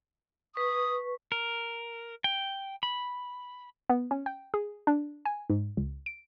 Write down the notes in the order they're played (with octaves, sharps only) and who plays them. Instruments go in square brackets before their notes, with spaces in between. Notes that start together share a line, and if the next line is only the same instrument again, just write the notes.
[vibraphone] B4 C#6 [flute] D#6
[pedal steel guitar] A#4
G5
B5
[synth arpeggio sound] B3
C#4
G5
G#4
D4
G#5
G#2
C#2
D7